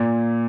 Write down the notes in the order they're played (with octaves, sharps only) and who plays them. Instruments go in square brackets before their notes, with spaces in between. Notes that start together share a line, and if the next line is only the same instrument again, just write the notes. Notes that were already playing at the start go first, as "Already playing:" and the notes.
Already playing: [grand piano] A#2